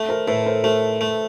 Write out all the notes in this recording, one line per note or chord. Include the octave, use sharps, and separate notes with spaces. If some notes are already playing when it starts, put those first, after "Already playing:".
Already playing: A3
A#4 C5
A2 A4 B4
A#4 C5
A3 A#4 C5
A3